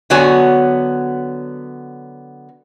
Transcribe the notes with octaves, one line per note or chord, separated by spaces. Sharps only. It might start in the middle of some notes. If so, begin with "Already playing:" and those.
D3 F#3 B3 F#4 C#5 G#5